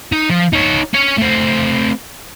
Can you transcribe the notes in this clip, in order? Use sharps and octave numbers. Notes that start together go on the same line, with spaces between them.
D#4
F3
D#4 C#5
C#4 C#5
A3 C4